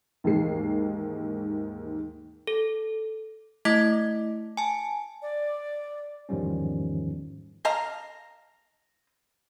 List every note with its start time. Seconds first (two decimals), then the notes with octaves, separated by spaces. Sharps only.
0.24 D#2 G#2 E3 G#3 C7
2.47 A4
3.65 A3 E4 D#5 D6 G#6 B6
4.57 G#5 A5
5.22 D5
6.29 E2 G#2 D#3 F3 G3 C#4
7.65 D#5 F5 A5 A#5